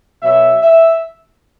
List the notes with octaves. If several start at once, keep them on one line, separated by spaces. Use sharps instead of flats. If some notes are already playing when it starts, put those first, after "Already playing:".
B2 F#3 E5
E5